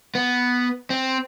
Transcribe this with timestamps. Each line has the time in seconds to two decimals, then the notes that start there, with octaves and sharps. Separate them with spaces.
0.15 B3
0.90 C4